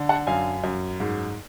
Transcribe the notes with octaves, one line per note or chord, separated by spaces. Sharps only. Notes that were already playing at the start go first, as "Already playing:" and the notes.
Already playing: D3
F#5 A5
F#2 F5 G#5
F#2
G#2